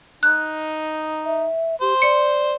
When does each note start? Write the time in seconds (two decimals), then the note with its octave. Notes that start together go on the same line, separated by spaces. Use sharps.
0.23 D#4 F#6
1.25 E5
1.81 G4 C5
2.02 D5 C#7